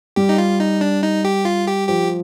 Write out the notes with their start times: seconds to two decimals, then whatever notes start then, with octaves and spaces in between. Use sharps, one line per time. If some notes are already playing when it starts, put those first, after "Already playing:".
0.16 G3 G4
0.29 D#4
0.38 F4
0.60 D#4
0.81 D4
1.02 D#4
1.25 G4
1.45 F4
1.67 G4
1.89 F3 G4